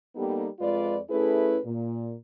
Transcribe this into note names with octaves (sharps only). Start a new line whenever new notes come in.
G3 A#3 B3 D#4 G4 A4
F2 G#3 F4 B4 D5
A3 C#4 E4 G#4 A4 B4
A#2